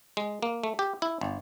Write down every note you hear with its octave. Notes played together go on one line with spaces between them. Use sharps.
G#3
A#3
A3
G4
E4
G1